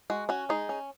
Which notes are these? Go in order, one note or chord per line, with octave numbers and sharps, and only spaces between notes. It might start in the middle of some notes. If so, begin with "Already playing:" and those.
G#3 F#4
C#4 F#4
G#3 D#4 G#4
C#4